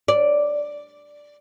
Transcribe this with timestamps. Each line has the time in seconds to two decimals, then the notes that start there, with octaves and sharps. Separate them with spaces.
0.08 D5